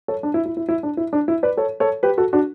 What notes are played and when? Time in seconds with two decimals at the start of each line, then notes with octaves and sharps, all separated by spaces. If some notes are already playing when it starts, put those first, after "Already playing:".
0.08 A4 C#5
0.23 D4
0.34 E4
0.46 E4
0.57 E4
0.68 E4
0.83 D4
0.97 E4
1.13 D4
1.28 E4
1.43 B4 D5
1.57 A4 C#5
1.80 A4 C#5
2.03 G4 B4
2.18 F#4 A4
2.33 D4 F#4